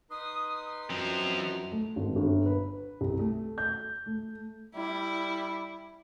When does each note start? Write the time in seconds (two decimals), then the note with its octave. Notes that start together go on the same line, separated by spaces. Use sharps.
0.11 D#4 B4 C6 D#6
0.90 F#2 F3 C4 F7
1.72 A3
1.96 G#1
2.16 G1
2.46 B4
3.01 C2
3.19 A3
3.58 G6
4.06 A3
4.75 G3 E4